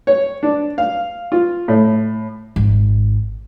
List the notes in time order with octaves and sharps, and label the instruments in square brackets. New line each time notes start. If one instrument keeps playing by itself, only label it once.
[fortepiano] C#5
D4
F5
F4
A2
[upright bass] G#1